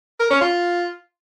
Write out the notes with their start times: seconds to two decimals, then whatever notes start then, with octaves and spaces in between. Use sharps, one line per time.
0.20 A#4
0.30 C#4
0.41 F4